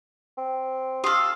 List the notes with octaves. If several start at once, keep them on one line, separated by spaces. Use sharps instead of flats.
C4
G4 A4 F5 C6 D#6